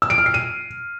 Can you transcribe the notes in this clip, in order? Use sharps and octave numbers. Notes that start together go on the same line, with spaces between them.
E6
D7
F6
C7
D#7